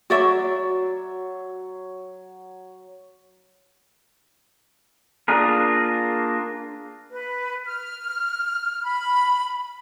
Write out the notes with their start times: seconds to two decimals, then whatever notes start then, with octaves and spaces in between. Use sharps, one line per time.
0.10 F#3 F#4 C#5 D5 E5 E6
5.28 A#3 D4 F4 G#4 A#4
7.10 B4
7.65 F6
8.84 B5